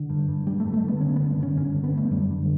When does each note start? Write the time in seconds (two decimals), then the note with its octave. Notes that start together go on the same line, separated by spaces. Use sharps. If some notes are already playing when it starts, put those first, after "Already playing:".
Already playing: D3
0.10 G2
0.28 G2
0.47 G2 G3
0.60 A3
0.65 G2
0.74 A3
0.84 D3 B3
1.01 D3 C#4
1.16 B3
1.19 G2
1.38 D3 C#4
1.57 G2 C#4
1.75 D3
1.84 B3
1.93 G2 A3
2.11 F#2 G3
2.30 D3